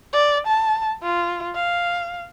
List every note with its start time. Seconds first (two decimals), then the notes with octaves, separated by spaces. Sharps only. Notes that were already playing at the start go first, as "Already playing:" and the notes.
0.13 D5
0.47 A5
1.03 F4
1.55 F5